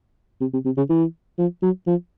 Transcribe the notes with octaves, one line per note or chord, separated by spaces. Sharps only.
C3
C3
C3
C#3
E3
F3
F#3
F3